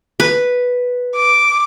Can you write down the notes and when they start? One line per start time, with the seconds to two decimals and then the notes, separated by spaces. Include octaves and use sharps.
0.20 B4
1.15 D6